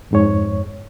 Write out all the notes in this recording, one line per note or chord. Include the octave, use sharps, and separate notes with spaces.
F2 G#2 C#5